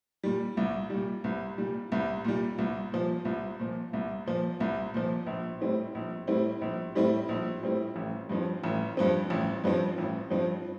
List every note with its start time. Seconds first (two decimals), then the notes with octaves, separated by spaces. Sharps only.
0.23 A#2 G3
0.57 C2
0.90 A#2 G3
1.24 C2
1.58 A#2 G3
1.92 C2
2.25 A#2 G3
2.58 C2
2.92 A#2 F3
3.25 C2
3.60 A#2 F3
3.93 C2
4.26 A#2 F3
4.60 C2
4.94 A#2 F3
5.26 A#1
5.61 A2 G3 C4 E4
5.95 A#1
6.27 A2 G3 C4 E4
6.61 A#1
6.95 A2 G3 C4 E4
7.29 A#1
7.62 A2 G3 C4 E4
7.96 A1
8.29 G2 F3 C4
8.64 A1
8.97 G2 F3 C4
9.30 A1
9.64 G2 F3 C4
9.98 A1
10.30 G2 F3 C4